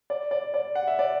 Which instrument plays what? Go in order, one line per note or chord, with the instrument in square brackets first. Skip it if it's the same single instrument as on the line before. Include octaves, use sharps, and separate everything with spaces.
[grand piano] D5
D5
D5
F#5
E5
D5